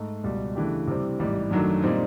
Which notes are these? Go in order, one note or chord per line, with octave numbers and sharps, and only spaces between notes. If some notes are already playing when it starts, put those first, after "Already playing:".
Already playing: G#2 A3
C#2 B2 G3
C#3 E3 A3 D4 G4
C3 E3 G3 C4
A1 G#2 E3 G3
F#2 D#3 F#3 A3 D4
A#2 G3 C4 D#4